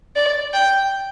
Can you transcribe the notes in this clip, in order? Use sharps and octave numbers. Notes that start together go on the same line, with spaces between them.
D5
G5